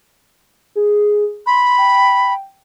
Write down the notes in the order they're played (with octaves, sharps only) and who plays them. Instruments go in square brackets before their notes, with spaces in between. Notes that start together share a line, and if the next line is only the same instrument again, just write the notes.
[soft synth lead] G#4
[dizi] B5 [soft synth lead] C6
[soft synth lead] G5